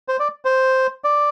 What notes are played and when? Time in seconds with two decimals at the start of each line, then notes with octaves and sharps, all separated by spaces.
0.08 C5
0.20 D5
0.45 C5
1.04 D5